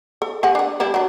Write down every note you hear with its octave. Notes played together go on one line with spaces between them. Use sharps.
A4
G4 F#5 G#5
D4 F#5
G3 D4 E4
F#3 D4